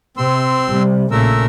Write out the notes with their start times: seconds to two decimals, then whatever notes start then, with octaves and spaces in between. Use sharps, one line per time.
0.17 C3 C4 C6 E6
0.69 C3 G3
1.11 A#1 A#2 C#3 A3 A#4 E6